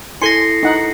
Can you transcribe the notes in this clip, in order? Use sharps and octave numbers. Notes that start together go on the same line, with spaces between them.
E4 A4 G#5 C6 A#6 C7 C#7
D#4 F#5